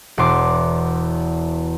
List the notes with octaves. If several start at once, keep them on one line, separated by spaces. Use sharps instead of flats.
E1 E2 C6 D6